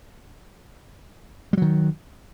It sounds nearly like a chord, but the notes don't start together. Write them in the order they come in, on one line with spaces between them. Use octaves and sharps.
G3 F#3 D#3